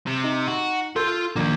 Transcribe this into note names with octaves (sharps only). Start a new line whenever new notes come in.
C3
D#4
F#4
F4 A4 C6 E6 G6
A#1 D#3 A#3 G6